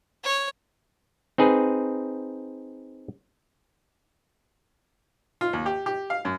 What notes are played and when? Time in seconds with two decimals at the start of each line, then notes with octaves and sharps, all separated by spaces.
0.24 C#5
1.38 C4 D#4 G#4 B4
5.41 F4
5.53 D#2
5.66 G4
5.86 G4
6.10 F5
6.25 F#2